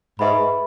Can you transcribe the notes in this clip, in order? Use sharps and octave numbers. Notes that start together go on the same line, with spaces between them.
G#2 G#4 B4 E5 B5